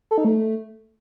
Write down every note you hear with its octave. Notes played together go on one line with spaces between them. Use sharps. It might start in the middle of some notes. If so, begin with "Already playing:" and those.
A4
D#4
A3